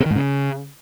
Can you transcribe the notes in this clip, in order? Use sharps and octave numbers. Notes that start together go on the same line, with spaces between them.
C3
D#3
G#2
C#3